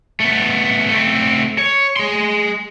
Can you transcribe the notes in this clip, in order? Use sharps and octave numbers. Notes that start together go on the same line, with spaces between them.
A3 B3
A3 C4
C#5
G#4 C6